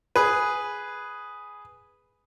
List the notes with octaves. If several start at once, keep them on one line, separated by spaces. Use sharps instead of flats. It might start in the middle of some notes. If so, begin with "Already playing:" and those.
G#4 B4